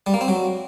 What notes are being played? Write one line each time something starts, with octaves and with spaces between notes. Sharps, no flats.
G3
A#3
C4
F#3